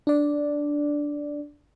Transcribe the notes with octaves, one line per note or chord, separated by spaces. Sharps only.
D4 D5